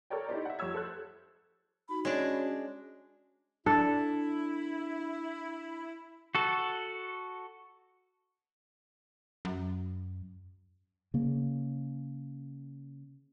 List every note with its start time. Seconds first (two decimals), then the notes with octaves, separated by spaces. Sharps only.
0.10 A4 A#4 C#5 D5 G5
0.29 D#4 E4 G4 C5 D5
0.45 E5 F#5
0.59 F2 G4 C#5 E6 G#6
0.74 A4 C5 F#6 G#6
1.89 D#4 F#4 B5
2.05 G#3 C#4 D4 F#4 C#5
3.66 D4 E4 A4
6.35 F#4 A4
9.45 F#2
11.14 C#3 A#3